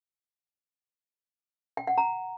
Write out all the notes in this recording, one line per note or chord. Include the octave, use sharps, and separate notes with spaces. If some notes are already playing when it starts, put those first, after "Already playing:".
G5
F#5
A#5